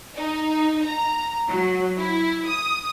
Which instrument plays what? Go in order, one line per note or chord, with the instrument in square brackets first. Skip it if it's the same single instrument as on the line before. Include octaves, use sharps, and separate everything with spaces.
[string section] D#4
A#5
F#3
E4
D#6